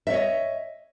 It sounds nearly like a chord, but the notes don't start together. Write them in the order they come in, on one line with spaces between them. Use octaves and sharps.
E5 C#5 D#5